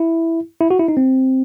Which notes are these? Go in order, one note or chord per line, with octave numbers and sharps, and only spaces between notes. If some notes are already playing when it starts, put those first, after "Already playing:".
Already playing: E4
E4
F#4
E4
D#4
C4